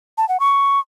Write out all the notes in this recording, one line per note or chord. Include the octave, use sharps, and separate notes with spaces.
A5
F#5
C#6